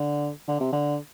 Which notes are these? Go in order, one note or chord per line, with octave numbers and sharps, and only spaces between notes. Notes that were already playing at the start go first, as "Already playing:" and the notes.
Already playing: D3
D3
C3
D3